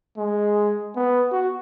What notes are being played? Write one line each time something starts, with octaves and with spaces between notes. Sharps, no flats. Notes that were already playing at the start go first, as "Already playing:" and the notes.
G#3
B3
F#4